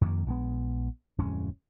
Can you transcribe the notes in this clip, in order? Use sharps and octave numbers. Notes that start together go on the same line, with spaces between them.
F2 D#3 A#3
A#1 G#3 B3
D1 F2 G#3 C#4